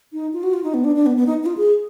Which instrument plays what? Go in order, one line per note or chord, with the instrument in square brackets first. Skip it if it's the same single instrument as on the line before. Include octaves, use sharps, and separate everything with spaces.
[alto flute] D#4
F4
F#4
F4
D#4
B3
D4
D4
B3
B3
D#4
D#4
F4
G#4